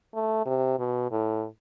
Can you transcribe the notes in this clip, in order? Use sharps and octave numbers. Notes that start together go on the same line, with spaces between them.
A3
C3
B2
A2